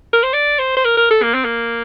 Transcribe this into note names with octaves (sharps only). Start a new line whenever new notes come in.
A#4
C5
D5
C5
C5
A#4
A#4
A4
A#3
C4
A#3